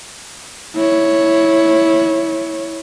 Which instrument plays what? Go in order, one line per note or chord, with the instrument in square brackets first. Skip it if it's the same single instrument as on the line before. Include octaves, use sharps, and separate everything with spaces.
[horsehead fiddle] E4 C#5